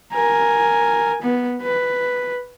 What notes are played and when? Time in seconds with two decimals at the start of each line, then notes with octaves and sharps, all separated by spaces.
0.13 A#4 G#5
1.22 B3
1.62 B4